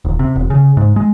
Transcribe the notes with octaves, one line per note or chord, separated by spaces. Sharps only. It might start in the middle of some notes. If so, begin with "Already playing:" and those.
D#1
C3
E1
C#3
G#2
G#3